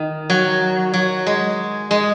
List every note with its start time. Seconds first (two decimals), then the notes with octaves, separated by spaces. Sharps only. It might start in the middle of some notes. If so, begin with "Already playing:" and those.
Already playing: D#3
0.30 F#3
0.94 F#3
1.26 G#3
1.91 G#3